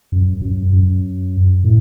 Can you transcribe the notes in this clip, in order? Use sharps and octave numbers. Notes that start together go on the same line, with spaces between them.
F#2
F#2
F#2
A2